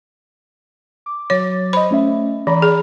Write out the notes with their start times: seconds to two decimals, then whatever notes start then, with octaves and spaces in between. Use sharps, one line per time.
1.06 D6
1.30 F#3 C#5 D6 A6
1.73 C5 D#5 B5
1.91 A3 C#4 E5
2.47 E3 D5 A#5 B5
2.62 G#4